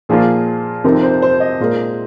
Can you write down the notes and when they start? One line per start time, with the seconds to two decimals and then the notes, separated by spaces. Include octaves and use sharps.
0.09 A#2 F3 A#3 F4 G#4
0.84 F2 C3 F3 C4 D#4 A#4
1.03 C5
1.22 C5
1.40 D#5
1.60 A#2 G#3 F4 A#4 D#5